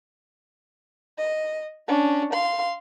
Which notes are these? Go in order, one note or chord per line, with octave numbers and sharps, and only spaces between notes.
D#5
C#4 D4
F5 C6